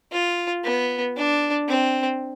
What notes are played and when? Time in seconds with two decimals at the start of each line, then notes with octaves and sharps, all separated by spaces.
0.13 F4
0.64 B3
1.16 D4
1.69 C4